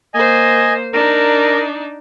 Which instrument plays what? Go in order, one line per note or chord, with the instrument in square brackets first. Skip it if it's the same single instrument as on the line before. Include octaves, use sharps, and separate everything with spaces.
[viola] A#3 C5 [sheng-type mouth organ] D#5 G#5
[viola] D4 D#4 [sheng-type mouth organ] A#4